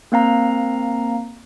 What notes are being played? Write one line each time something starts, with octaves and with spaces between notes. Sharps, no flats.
A#3 C4 F5 A#5